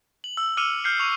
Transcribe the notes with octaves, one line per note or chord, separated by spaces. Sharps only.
F#7
E6
D6 E6 F6 C#7 D#7 F7
F6 G6 C7 C#7
C#6 F7